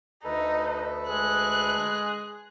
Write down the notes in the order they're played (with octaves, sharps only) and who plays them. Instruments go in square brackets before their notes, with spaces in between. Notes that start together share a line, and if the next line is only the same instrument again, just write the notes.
[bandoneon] D2 A4 B4 [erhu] D#4
[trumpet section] G#3 G#4 [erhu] F#6